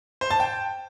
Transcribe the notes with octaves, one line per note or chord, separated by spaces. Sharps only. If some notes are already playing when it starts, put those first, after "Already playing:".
C5
A5
G5